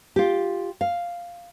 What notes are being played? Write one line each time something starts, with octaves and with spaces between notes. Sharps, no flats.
F4 G4
F5